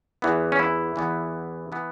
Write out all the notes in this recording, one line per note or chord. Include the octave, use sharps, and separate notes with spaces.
E2 E3 B3
C#4
E4
E2 E3 B3
E3 B3